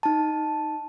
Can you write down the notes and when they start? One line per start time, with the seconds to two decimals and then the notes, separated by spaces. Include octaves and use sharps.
0.03 D#4 A5